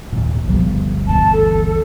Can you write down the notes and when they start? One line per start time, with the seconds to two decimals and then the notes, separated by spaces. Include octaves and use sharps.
0.13 G#1 D#2 A#2
0.47 G1 D2 B2 F3 G3
1.07 B2 E3 A5
1.32 A4